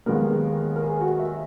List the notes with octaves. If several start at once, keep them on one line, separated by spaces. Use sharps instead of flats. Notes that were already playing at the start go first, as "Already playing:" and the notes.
D#2 D#3 G#3 B3 A#4
A#4
G#4
F#4
E5